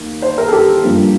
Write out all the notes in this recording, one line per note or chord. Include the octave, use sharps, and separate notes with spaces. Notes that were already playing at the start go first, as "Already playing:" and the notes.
Already playing: D#2 D#3 A#3
C5
A#4
A4
G4
G2 F3 A#3